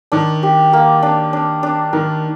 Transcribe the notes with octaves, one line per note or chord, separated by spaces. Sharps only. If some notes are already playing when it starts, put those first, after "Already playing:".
D#3 D4
G4
A#3
D4
D4
D4
D#3 A#4